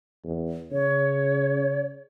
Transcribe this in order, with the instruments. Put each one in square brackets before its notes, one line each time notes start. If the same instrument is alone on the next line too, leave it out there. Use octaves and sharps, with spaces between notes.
[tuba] E2
[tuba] C#3 [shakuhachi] C#5